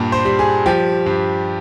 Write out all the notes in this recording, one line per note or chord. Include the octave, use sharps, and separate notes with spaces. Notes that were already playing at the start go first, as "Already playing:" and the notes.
Already playing: G2 A#2
C5
G3
G#4
F3 G4
G2